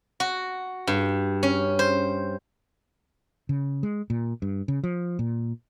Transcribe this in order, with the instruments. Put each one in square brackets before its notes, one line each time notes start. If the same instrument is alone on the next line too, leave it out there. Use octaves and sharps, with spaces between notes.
[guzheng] F#4
G2
C#4
C5
[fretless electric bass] C#3
G#3
A#2
G2
C#3
F3
A#2